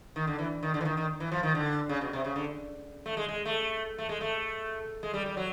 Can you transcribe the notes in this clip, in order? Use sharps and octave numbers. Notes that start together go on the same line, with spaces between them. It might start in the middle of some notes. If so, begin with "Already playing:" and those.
D#3
D3
E3
D#3
D3
E3
D#3
D#3
E3
F3
D#3
D3
C#3
B2
C3
C#3
D3
A3
G#3
G#3
A3
A3
G#3
A3
G#3
G3
G3
F#3